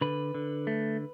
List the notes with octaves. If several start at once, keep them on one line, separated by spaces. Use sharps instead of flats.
D3 B4
D3
A3